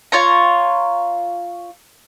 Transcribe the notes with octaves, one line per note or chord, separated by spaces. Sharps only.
F4 C#5 A#5